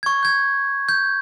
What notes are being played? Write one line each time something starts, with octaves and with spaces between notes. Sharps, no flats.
C#6 G#6
G6 G#6
G6